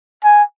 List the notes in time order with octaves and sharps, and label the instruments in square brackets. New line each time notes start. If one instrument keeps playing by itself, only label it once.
[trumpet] G#5